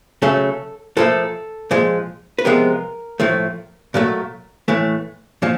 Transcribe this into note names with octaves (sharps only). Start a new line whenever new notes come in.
C#3 F#3 A3 A4
A#2 F3 A3 A4
A#2 F3 G#3
B4
C3 F3 G#3 B3 A#4
A2 F3 A3
A#2 F#3 A3
A2 E3 A3
A#2 F3